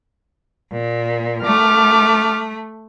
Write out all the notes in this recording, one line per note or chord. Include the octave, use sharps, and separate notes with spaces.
A#2
A3 D6 F6